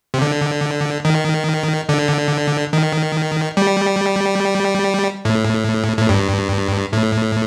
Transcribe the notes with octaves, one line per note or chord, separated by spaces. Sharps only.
C3
D3
D#3
D3
D#3
G3
A2
A2
G2
A2